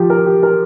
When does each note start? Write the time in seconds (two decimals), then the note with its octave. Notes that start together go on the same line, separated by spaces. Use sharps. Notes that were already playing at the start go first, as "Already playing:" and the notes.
Already playing: F3 G4
0.10 A#4
0.26 G4
0.43 A#4